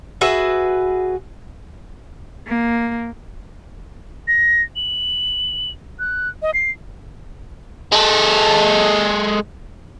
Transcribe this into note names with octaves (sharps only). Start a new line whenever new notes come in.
F#4 G#4 B4 E5
A#3
A#6
F#7
F#6
D#5
C7
G#3 A4